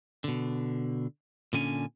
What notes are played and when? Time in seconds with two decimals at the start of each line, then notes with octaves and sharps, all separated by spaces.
0.24 B2 D3
1.53 A#2 D3 C#4 G#5